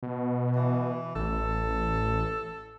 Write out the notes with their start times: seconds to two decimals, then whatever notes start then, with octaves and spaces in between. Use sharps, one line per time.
0.03 B2
0.56 E3
1.15 A1 A4